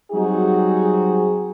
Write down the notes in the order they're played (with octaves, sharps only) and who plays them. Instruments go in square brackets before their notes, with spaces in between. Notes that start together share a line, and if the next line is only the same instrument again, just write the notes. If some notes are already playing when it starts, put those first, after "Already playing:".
[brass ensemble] F#3 G3 C4 D#4 F#4 G#4